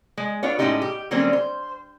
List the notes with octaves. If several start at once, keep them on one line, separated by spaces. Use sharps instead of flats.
G#3
B3 D4 F4 C#5
A2 F3 G#3 C#4 D#4 G4
G4
D3 F#3 G3 A#3 C4 C#4
C5